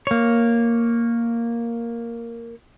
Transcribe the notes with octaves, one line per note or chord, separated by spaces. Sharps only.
A#3 C#5